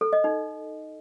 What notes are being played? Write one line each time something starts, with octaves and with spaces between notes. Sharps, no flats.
A4
D#5
D#4